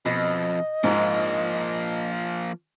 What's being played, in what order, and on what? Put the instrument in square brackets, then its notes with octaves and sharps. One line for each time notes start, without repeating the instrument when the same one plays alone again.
[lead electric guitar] F2 [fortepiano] B2 [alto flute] D#5
[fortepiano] G#2 D#4 F4 [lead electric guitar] F3 A#3